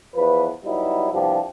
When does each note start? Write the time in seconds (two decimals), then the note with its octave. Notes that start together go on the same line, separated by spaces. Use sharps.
0.16 E2 F3 B4
0.65 F#3 G3 B3 D#4 E4
1.13 C2 F3 B3 D4 G4